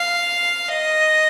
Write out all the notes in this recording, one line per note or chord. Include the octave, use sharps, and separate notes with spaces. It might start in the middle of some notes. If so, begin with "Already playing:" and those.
Already playing: F5
D#5